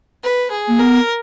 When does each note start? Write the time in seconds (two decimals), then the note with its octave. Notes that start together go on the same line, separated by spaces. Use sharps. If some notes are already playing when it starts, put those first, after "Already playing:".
0.24 B4
0.51 G#4
0.68 A#3
0.79 B3 A#4